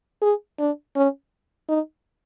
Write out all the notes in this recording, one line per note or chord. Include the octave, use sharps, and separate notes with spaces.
G#4
D4
C#4
D#4